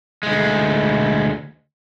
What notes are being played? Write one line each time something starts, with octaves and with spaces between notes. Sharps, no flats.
D2 G#3